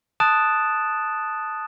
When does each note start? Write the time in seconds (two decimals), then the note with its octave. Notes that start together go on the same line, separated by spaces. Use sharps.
0.20 A5 D#6 F#6 A6 D7 E7